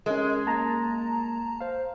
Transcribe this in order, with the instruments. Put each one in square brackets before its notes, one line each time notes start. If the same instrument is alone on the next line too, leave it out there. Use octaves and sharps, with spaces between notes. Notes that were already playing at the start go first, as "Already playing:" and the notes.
[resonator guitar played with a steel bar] G#3 [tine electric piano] C#4 A#4
[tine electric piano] A#3 [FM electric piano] A5 A#5
[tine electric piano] C5 F5